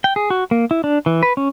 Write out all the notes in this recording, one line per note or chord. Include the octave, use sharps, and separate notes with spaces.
G5
G#4
F#4
A#3
E4
D4
E3
B4
C#4